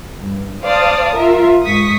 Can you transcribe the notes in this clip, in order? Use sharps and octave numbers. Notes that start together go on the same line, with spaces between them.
G2
C5 D5 F5 A5 D#6
F4 A#4 E5
G#2 C#6 D#6 B6